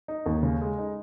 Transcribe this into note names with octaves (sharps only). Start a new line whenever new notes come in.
D#4
D#2
C#3
G#3
D#4